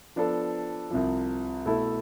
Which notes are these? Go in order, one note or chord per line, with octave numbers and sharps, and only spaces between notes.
F3 B3 D4 A4
C2 C3 F3
B2 A3 E4 A4